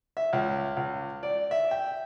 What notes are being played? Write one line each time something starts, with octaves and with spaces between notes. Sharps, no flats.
E5
C#2
C#2
D5
E5
G5